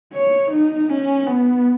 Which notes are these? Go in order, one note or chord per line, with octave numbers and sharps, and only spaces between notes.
C#5
D#4
C#4
B3